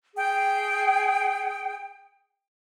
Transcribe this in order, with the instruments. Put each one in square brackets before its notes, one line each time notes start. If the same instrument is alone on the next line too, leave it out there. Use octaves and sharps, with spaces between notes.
[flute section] G#4 G5